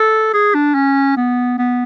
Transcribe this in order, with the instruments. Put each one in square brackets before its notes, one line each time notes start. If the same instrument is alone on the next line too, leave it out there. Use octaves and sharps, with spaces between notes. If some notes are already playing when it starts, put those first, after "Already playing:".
Already playing: [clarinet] A4
G#4
D4
C#4
B3
B3